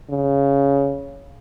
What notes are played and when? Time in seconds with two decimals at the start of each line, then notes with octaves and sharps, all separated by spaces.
0.10 C#3